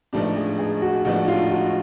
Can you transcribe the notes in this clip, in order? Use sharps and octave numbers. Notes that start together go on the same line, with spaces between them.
A1 G#2 F3 A3 D4 G4
G#4
G#4
F#4
A1 G#2 F3 A3 D4 F#4
F4
F#4